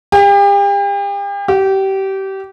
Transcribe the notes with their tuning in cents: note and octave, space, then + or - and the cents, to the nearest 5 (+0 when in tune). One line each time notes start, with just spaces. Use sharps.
G4 +40
G4 -25